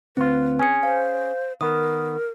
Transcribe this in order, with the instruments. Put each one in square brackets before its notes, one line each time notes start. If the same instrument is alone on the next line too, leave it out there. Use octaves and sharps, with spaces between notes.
[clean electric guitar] D2 F4 [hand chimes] C4 [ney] B4
[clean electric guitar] C#4 G#4 [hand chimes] G#5 C#7
[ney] C5 [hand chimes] F5
[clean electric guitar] D#3 B3 [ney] A#4 [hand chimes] D#6